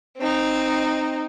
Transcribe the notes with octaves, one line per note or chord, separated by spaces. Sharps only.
C4 D#4